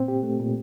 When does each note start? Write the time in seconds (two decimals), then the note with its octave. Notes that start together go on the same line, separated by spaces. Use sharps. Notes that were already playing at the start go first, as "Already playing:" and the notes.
Already playing: A#2 C4
0.08 G4
0.23 A3
0.40 A#2